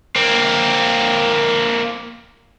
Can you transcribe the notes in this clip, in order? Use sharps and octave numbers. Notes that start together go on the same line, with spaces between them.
A#3 C4